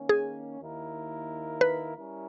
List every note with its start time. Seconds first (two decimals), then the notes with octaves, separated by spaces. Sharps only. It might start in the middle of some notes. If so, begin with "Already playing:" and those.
Already playing: D#3 A#3 C#4
0.09 G#4
0.60 D#2 D#3 A#3 E4 A#4
1.61 B4
1.96 G3 C#4 E4 A#4